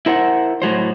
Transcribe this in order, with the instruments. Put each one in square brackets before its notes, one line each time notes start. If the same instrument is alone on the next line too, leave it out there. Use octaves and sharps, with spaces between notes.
[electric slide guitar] E4 A#4 C5 F#5
A2 F#3 C5